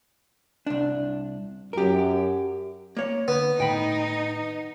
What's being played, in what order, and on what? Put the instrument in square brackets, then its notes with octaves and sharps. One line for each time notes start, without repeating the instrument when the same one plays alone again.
[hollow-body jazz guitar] C2 D4
[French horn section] F#2 [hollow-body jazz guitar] G4 A#4
[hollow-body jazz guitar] A#3 C#5
[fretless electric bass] D3 [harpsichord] B3
[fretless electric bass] A2 D#3 [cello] D#4 [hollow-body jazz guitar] G5 B5